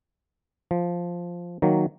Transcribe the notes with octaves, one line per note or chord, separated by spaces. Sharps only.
F3
D#3 F#3 A#3